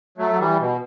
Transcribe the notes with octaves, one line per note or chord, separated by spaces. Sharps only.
F#3 A3
F#3
E3 G3
B2